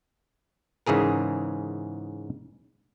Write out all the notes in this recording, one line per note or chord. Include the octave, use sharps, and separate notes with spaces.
G#2 C#3 E3 G#4 A#4